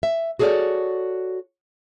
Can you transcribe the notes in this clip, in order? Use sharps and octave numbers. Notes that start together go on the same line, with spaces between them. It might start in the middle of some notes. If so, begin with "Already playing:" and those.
E5
F#4 G#4 A4 C#5 D5